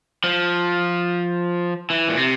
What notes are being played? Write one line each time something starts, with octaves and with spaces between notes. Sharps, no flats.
F3
E3
A#2
C3